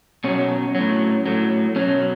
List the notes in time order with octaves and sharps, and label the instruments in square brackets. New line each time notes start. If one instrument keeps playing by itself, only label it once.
[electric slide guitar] B2 F#3 C#4
A2 F#3
A2 F#3
B2 F#3 C#4